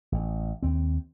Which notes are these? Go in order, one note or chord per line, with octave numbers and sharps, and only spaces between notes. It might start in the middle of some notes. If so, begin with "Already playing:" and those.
A1
D#2 C4